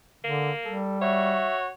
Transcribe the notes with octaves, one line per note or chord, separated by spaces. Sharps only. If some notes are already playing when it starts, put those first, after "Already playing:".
D3 A#3
G3 A4
F#4 C#5 E5